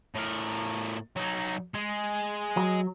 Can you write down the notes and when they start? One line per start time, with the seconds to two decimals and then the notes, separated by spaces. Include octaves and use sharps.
0.15 A2 A#4
1.16 F#3 D#4
1.74 G#3
2.57 F#3